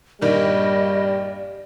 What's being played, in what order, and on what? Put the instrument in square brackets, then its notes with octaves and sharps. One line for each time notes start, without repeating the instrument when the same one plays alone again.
[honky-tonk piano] A#1 G2 D#3 [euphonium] G3 [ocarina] D5 [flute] D#5